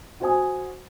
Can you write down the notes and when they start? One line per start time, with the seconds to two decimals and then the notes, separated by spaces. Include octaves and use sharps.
0.20 F#4 C5 G#5 D#6